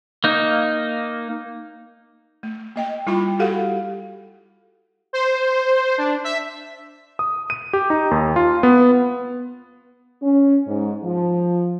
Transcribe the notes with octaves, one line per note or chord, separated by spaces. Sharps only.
A#3 D#4
A3
A#3 D#5 G5
G3 E4 F4 G5 B5
F#4 G4 A4 F5 F#5
C5
D4
E5
D#6
D#7
G4
D#4
D#2
F4
B3
C#4
G#2
F3